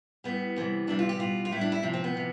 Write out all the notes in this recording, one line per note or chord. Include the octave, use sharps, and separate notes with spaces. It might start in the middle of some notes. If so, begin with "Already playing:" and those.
A2 G3 B3
C3 E3 G3
C3 E3 G3 D4
F4
G4
B2 G3 F4
F4
A2 G3 E4
D4
E4
C3 F3 D4
C4
B3
C3 F3